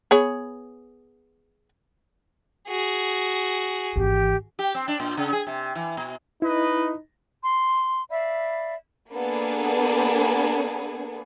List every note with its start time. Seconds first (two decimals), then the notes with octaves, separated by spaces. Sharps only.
0.11 B3 G#4 C#5
2.69 F#4 G#4
3.96 G#1 E3 G4
4.59 G4
4.75 C4
4.88 D4
5.00 A#2
5.17 C#3
5.33 G#4
5.47 C3
5.75 E3
5.97 B2
6.42 D#4 E4 B4 D#5
7.43 C6
8.10 D5 E5 F5 B5
9.13 A#3 B3 D4 G#4 A4 B4